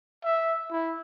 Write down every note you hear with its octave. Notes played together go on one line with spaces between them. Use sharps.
E5
E4